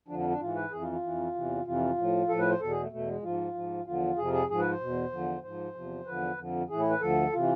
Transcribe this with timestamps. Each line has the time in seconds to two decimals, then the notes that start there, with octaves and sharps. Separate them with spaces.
0.08 F2 D3 F3 D4
0.19 D4
0.29 D4
0.40 G#2 E3 F4
0.55 B4
0.71 F2 E3 G#4
0.82 F4
0.92 F4
1.03 F2 E3
1.35 E2 C3 E3
1.66 F2 C3 E3 F4
1.98 A2 F3
2.29 A2 F3 A4
2.39 B4
2.50 C5
2.60 E2 B2 A4
2.71 G#4
2.81 A3
2.91 E2 B2 A3
3.07 G#3
3.23 G#2 F3 F4
3.54 G#2 F3
3.86 E2 D3 F3 F4
4.17 F2 C3 F3 G#4
4.33 G#4
4.49 G#2 F3 G#4
4.60 B4
4.70 C5
4.80 E2 B2
5.12 E2 D3 F3
5.43 G#2 F3 C5
5.75 E2 C3 F3
6.06 E2 D3 F3 B4
6.38 F2 D3 F3
6.69 A2 E3 G#4
6.80 E4
6.90 B4
7.01 D2 D3 F3 A4
7.33 C3 E3 F4